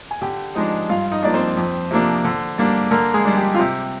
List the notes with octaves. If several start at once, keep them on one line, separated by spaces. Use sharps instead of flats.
G#5
D3 G4 G5
F3 G#3 D4 D#4 D#5
G2 F4 F5
D#4 D#5
F3 A#3 D4 D5
C4 C5
F2
C3 F3 A#3 D4
D3
G3 A#3 D4
D3 A#3 A#4
G#3 G#4
G3 D4
G4
F4
C3 G4